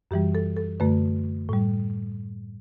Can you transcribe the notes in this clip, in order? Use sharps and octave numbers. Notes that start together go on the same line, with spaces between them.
F#2 E3 G3 G4
A4
A4
F#2 D3 A3 B4
A2 G3